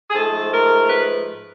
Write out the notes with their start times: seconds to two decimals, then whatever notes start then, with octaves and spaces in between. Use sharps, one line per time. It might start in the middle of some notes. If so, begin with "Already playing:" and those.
0.10 G#4
0.13 G#2 F3 A3 A4
0.51 A#4
0.89 B4